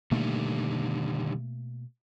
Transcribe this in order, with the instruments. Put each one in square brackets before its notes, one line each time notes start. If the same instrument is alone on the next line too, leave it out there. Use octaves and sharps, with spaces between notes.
[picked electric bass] B2 A3 A#3 [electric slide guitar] D3 D#3 G3